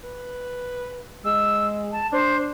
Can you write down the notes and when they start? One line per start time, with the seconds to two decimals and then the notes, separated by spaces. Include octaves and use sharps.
0.03 B4
1.25 G#3 E6
1.92 A5
2.12 D4 C5